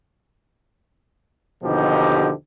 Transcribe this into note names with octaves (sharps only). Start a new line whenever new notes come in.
D#2 B2 D3 F3 D#4 G4